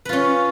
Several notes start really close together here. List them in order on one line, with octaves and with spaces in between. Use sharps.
B4 F4 C#4